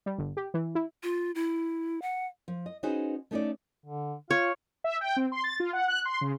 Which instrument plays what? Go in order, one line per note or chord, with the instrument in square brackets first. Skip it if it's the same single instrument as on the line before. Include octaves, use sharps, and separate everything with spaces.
[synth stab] G3
G1
G4
E3
E4
[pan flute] F4
E4
F#5
[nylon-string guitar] F3
D#5
C#4 D#4 F#4 G#4 B4 C5
A3 C#4 D#4 G#4 A4 D5
[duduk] D3
[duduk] F4 [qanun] C#5
[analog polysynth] E5
G5
C4
C6
A6
F4
F#5
F#6
C6
C#3